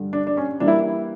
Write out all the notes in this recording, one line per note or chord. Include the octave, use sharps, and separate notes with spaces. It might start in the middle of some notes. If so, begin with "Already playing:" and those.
Already playing: G2 D3 G3
D4
D4
C#4
E3 G3 A#3 D4
E4